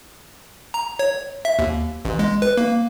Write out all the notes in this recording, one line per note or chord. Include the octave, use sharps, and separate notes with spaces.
A#5
C#5
E5
D#2
A1
G#3
B4
A#3